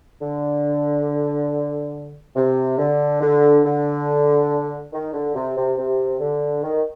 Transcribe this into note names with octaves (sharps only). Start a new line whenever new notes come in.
D3
C3
D3
D3
D3
D#3
D3
C3
C3
C3
D3
D#3